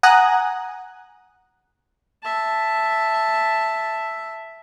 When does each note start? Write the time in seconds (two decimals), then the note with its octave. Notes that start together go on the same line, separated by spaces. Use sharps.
0.03 F#5 G#5 A#5 D#6 F#6
2.23 E5 A5